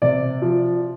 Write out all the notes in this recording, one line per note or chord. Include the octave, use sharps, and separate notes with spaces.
C3 D5
F3